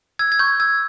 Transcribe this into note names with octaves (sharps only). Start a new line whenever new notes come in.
E6 G#6
G#6
C#6 G6
E6 G#6